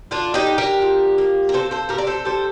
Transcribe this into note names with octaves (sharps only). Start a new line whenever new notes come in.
D3 D4 F4
D#4 G4
D3
G4 A#4
F3
A#3
A#4
C3 A4 C5
A4 C5
C3 G4 A#4
D5
A4 C5
G3 A4 C5